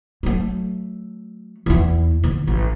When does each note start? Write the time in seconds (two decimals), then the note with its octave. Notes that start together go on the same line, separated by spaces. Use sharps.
0.23 F#3 A3
1.66 E2 E4
2.24 D3
2.48 A1